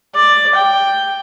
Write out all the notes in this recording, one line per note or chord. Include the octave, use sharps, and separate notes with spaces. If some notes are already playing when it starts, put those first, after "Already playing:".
D5
G5